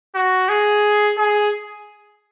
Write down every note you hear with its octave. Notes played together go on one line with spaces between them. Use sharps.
F#4
G#4
G#4